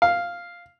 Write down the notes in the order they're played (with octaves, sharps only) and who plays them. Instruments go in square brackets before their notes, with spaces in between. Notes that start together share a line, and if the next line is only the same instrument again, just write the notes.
[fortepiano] F5